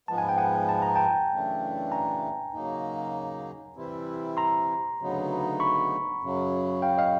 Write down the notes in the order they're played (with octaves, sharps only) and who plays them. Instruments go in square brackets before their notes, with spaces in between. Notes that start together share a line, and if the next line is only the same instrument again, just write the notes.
[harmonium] G#2 F3 G#3 B3 [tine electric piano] A5
[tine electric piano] G#5
G5
F#5 G#5
A5
A#5
G5 A5
[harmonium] F#2 C#3 E3 A3 D4
[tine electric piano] G#5 A#5
[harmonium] C#3 F#3 A#3 D#4
C3 E3 G3 C4 E4
[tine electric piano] A#5 C6
[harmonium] D2 C#3 F#3 B3 D#4
[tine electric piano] B5 C#6
[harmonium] F#2 C#3 F#3
[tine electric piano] F5 G5
D#5 F5